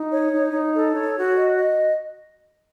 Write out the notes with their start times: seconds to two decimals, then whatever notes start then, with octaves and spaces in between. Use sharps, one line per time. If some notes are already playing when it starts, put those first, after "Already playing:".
Already playing: D#4
0.11 C#5
0.32 D#4
0.52 D#4
0.74 A4
0.94 C#5
1.16 F#4
1.36 D#5
1.58 D#5